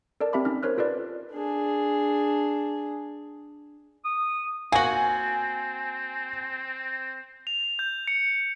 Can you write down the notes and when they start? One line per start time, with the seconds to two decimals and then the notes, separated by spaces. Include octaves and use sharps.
0.21 A4 A#4 D5 A5
0.33 C4 G4 E5 A5 B5 D6
0.45 C#4 D#4 F6
0.63 A#4 C5 C#5 F6 F#6
0.78 F4 A4 B4 D5
1.33 D4 G#4
4.05 D#6
4.72 A#3 C4 F#4 G#5 F#7
7.47 F7
7.79 G6
8.08 C#7